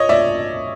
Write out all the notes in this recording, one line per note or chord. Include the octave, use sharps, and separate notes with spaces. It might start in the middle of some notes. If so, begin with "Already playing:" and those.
Already playing: C#5 D#5
D5 E5